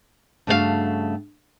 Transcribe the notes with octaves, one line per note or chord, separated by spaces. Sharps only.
G2 C#3 A3 F#4 G#4 F5